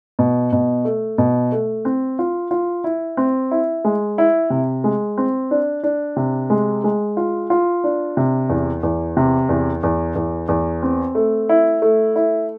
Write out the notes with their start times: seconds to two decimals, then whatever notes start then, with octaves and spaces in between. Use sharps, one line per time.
0.19 B2
0.52 B2
0.85 A3
1.18 B2
1.52 A3
1.85 C4
2.19 F4
2.51 F4
2.84 E4
3.17 C4
3.51 E4
3.85 G#3
4.18 E4
4.50 C3
4.84 G#3
5.18 C4
5.51 D4
5.83 D4
6.16 C3
6.50 G#3
6.84 G#3
7.17 F4
7.50 F4
7.84 D4
8.17 C3
8.49 E2
8.83 E2
9.17 C3
9.49 E2
9.83 E2
10.15 E2
10.48 E2
10.83 C4
11.15 A3
11.49 E4
11.82 A3
12.16 E4